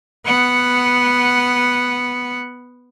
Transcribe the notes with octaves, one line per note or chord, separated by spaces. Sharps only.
B3 F#5